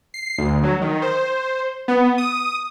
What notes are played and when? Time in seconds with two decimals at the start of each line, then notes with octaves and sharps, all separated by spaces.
0.14 C7
0.38 D2
0.63 F#3
0.82 D#3
1.02 C5
1.88 B3
2.18 D#6